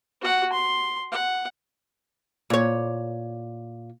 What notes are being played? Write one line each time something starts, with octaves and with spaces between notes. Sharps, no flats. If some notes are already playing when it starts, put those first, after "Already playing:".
F#4 F#5
C6
F#5
A#2 C#5